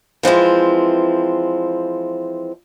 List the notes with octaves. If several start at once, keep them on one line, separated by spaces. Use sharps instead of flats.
E3 F3 G#3 C4